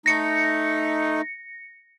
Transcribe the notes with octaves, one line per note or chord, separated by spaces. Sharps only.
A3 D#4 A#6 C#7